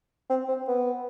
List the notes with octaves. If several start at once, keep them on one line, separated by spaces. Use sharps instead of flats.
C4
C4
B3